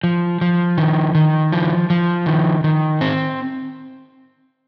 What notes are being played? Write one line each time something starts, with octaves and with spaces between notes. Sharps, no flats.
F3
F3
D#3
D#3
F3
F3
D#3
D#3
C4